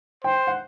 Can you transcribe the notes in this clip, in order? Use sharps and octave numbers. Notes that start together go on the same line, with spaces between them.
C5 G5
F#5